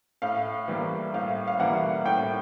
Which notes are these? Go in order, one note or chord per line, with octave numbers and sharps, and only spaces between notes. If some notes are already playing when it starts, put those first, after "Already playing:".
A2 F5
E3 G3 A#3
A2 F5
F5
E3 G3 A#3 F#5
A2 G5